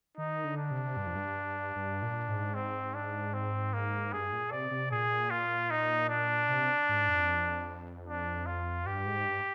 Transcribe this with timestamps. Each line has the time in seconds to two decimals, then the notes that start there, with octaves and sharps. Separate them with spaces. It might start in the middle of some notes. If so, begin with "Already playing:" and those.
0.17 D#3 D#4
0.44 D3
0.57 D4
0.71 C3
0.97 G2
1.07 F2
1.16 G2
1.76 G2
2.02 A#2
2.28 G#2
2.54 C4
2.94 D4
3.34 C4
3.74 A#3
4.12 G2 G#4
4.32 A#2
4.51 C3 D5
4.71 C3
4.91 A#2 G#4
5.31 F4
5.70 D#4
6.09 D4
6.49 C3
6.89 G#2
7.08 F2
8.08 D4
8.46 F4
8.86 G2 G4
9.06 G#2
9.25 G2